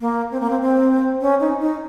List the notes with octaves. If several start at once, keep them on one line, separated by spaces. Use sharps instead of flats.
A#3
C4
A#3
C4
C4
C#4
D#4
D#4